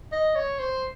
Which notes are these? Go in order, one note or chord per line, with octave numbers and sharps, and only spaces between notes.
D#5
C#5
C5